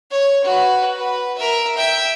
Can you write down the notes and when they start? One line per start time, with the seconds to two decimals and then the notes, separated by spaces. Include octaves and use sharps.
0.11 C#5
0.44 F#4 B4
0.96 B4
1.38 A#4 E5
1.77 E5 G5